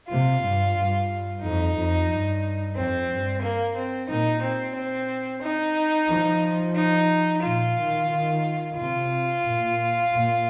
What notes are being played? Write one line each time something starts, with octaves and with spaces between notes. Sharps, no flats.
C3 F4
G2
G2
F2 D#4
F2
G2
F2 C4
G2
A#3
C4
A#2 D#4
C4
C4
D#4
F3
D#4
A#2 F4
D#3
D#3
C3 F4
A#2
A#2